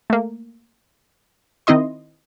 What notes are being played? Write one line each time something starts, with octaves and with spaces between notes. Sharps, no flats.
A3 A#3
D#3 C4 E4 D#5 C6